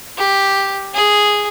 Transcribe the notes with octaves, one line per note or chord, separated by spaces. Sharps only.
G4
G#4